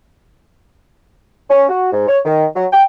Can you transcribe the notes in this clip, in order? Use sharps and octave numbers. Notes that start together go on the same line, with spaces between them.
C#4
F#4
G#2
C#5
D#3
F#3
G5